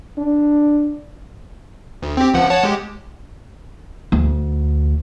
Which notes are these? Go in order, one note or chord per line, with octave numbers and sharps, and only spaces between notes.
D4
D2
C4 G4
C#2 F3 F#5
C#5 F#5 A5
G#3 G4
D2